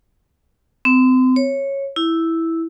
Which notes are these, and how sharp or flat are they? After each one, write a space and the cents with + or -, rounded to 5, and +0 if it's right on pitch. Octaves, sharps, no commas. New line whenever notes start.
C4 -35
C#5 -10
E4 -5